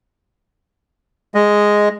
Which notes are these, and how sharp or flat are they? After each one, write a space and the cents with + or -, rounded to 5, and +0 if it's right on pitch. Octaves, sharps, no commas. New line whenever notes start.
G#3 +0 D#5 +0